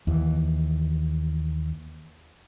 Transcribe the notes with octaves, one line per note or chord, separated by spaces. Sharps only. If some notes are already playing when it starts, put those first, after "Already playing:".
D#2 E3